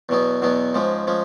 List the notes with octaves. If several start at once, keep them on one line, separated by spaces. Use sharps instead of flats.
E2 B2 F#3 B3
E2 B2 F#3 B3
G#2 F3 G#3 C#4
F3 G#3 C#4